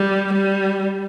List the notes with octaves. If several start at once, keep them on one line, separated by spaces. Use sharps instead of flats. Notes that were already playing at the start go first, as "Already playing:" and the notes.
Already playing: G3
G3